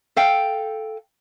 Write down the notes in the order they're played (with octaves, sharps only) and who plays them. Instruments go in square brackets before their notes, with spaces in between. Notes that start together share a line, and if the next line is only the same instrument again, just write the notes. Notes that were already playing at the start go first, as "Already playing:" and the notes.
[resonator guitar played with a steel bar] A4 F5 G5